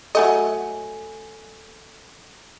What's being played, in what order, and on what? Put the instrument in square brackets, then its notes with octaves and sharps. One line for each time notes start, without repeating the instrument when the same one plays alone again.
[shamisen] F#3 A3 D#5 [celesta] A4 G#5